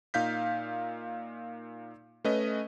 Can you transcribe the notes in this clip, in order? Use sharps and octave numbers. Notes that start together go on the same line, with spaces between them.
A#2 D#4 F5 G6 B6
A3 C#4 B4 D#5